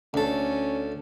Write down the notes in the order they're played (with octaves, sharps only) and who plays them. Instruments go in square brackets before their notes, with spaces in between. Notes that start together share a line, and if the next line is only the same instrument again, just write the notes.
[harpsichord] D2 A4 [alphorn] C#4